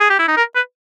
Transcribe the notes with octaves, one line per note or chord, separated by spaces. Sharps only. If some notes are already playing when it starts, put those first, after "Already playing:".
G#4
G4
E4
D#4
A#4
B4